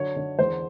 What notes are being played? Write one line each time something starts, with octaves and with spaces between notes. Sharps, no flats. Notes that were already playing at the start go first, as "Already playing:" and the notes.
Already playing: D3 F#3 C#5
D3
E2 C5